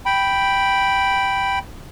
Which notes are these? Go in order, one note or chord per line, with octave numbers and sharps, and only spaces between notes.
G5 B5